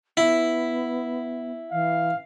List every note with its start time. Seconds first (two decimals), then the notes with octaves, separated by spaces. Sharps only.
0.17 B3 E4
1.72 E3 F5